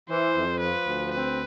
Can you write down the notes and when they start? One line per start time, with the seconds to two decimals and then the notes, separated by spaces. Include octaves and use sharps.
0.09 E3 C5
0.36 F2
0.61 F3 B4
0.87 D2
1.12 C4 B4